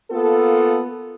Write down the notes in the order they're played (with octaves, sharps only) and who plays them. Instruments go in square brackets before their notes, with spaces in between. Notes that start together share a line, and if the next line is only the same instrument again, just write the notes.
[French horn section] A#3 B3 F4 A4